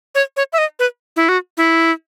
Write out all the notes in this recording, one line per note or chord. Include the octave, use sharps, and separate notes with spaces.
C#5
C#5
E5
D#5
B4
E4
F#4
E4